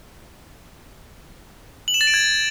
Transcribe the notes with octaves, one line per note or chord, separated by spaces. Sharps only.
F#7
E7
A6
D7
G#6